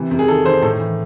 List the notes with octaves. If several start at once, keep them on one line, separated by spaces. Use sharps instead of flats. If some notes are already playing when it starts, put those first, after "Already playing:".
Already playing: C3 E3
C3
G#4
D#3 A4
D#3 C5
A2 A4
E3